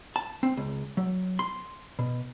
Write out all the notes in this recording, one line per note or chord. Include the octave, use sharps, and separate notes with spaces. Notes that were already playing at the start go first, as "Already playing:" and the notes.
A5
C4
C#2
F#3
C6
B2